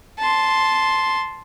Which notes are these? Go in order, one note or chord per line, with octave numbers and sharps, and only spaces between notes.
A5 C6